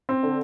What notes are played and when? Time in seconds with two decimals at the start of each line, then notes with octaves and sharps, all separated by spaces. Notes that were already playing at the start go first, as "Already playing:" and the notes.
0.09 C4
0.23 D3